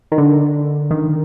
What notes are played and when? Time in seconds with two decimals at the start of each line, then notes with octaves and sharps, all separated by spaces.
0.12 D#3
0.18 D3
0.91 D#3